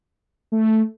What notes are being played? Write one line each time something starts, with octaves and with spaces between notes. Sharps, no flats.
A3